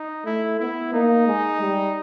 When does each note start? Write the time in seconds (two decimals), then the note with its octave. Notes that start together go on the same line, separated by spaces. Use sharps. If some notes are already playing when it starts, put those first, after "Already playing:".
Already playing: D#4
0.25 A3 E4
0.60 B3 E4
0.93 A#3 D#4
1.27 G#3
1.60 G3